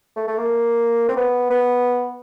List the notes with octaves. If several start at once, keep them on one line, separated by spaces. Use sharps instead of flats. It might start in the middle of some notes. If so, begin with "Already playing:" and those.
A3
A3
A#3
C4
B3
B3